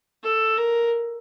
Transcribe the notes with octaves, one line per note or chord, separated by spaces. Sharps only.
A4
A#4